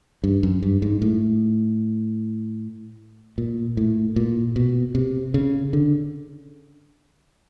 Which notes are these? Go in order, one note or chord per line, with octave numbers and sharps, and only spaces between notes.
G2
F#2
G2
G#2
A2
A#2
A2
A#2
B2
C3
C#3
D3